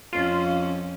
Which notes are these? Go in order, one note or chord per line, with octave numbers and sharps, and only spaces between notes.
F2 C#4 F4